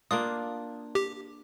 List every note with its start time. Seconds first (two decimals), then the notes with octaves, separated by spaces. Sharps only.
0.11 A#3 D4 F4 D#6
0.95 G4